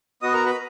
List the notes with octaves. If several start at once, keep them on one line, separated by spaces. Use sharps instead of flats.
B3 F#4 D#5 D#6
A#4 A#5
B4 B5